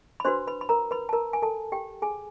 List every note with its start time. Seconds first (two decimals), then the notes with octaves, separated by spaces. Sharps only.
0.20 B5
0.25 D4 F#4 B4 C5 C6
0.47 B4 B5
0.61 B5
0.69 A#4 A#5
0.91 B4 B5
1.09 A5
1.13 A#4 A#5
1.33 G#5
1.42 A4 A5
1.72 G4 G5
2.02 G#4 G#5